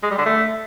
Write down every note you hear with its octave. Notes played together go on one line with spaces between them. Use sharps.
G#3
G3
D3
A3